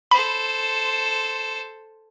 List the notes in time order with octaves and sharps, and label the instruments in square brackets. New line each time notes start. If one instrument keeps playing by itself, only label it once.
[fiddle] A4 C5 [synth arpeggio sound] B5